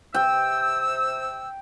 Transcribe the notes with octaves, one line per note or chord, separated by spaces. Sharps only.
C3 G5 E6